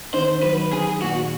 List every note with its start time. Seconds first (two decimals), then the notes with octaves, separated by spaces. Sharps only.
0.14 D#3 C5
0.43 F#3 B4
0.73 D#3 G#4
1.02 A#2 F#4